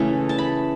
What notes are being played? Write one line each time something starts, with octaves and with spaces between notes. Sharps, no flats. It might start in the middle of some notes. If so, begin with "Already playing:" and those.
Already playing: C#3 E3 A3 C#4
A5
B5